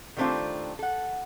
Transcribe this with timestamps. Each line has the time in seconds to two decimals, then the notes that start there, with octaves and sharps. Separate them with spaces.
0.17 D#3 G3 A3 C4 D4 F4
0.79 A4 F#5